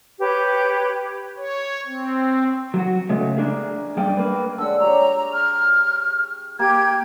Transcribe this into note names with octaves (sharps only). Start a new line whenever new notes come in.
G4 B4 C#5
C#5
C4
F#3 F#4
C#3 F#3 G#3 A3
A#3 D4 G#4
F#2 G3 D4 G#4 D5 G5
A#3 B4
D3 G#3 F#5 E6
G4 C#5 A#5
F6
A#3 G4 G5 G#6